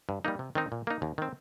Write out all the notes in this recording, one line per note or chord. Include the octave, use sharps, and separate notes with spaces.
G2
G3 A#3 D#4
C3
D#3 C4 D#4
A#2
A#3 D#4
D#2
D#3 C4